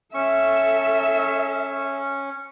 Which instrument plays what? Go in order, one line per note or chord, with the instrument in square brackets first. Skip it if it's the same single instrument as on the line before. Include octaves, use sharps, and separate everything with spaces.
[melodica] C#4 C#6 [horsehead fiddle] A4 E5